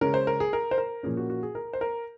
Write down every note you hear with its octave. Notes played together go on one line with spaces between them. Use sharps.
C#3 G#3 C#4 A#4
C5
A#4
G#4
A#4
C5
A#4
A#2 F3 A#3 C#4 G#4
F#4
F#4
G#4
A#4
C5
A#4